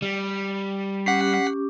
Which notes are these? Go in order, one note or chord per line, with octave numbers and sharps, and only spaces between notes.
G3
C#4 G4 F#5 D6 B6 C7